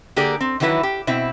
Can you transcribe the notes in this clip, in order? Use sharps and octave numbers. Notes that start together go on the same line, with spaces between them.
D3 A#3 G4 G#4 A#4 D5
C4
D#3 E3 F#3 E4 B4
G4
B2 C4 E4